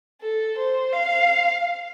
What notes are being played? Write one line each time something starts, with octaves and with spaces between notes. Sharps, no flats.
A4
C5
F5